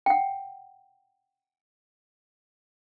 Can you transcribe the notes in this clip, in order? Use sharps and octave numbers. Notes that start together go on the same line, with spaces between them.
F#5 G5